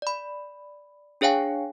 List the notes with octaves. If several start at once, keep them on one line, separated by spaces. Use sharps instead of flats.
D5 B5
D4 G#4 C#5 F5 G5 G#5